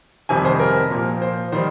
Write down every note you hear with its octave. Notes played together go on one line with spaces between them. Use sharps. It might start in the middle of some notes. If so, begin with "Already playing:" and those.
F2 C3 D#3 G3 G#5
C5
A#4
A#2 F3
C5
D#3 G3 C5